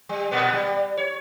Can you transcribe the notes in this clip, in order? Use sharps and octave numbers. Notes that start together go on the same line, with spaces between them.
G3
A#2 A#3 B3
G3
C#5